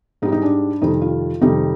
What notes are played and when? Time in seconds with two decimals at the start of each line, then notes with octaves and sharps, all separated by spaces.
0.22 G#2 D#4
0.25 G3
0.32 D#4
0.42 D4
0.82 F2 C3 D#3 G3 D#4
1.01 F4
1.41 F2 C3 D#3 G3 D#4